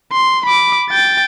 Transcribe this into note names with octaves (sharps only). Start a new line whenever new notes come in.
C6
B5 D6
G5 A6